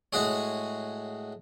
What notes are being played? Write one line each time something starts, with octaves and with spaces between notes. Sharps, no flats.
A2 G#3 F#4 G#4 C#5